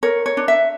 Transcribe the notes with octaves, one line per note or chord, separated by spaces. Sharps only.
A#4 C#5
C#5
D4
E5